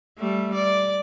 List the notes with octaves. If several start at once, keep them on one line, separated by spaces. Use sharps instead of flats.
G3 A3
D5